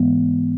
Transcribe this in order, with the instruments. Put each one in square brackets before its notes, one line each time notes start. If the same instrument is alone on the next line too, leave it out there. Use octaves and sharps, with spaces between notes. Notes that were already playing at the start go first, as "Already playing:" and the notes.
Already playing: [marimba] G#2 E3 G#3 B3